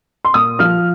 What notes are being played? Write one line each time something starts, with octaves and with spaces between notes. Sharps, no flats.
C6
A#2 D#6
F3 F6